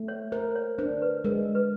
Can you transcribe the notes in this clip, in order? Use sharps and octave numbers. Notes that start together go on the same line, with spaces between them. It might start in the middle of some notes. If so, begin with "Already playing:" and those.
Already playing: A3
C#5
A#4 C5
C#5
D4 C5
B4
G#3 A#4
B4